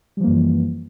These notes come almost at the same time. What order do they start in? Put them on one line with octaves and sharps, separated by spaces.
G3 F3 A#3 F#2 E3